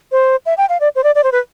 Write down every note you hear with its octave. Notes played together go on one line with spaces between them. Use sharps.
C5
E5
G5
F5
D5
C5
D5
D5
C5
B4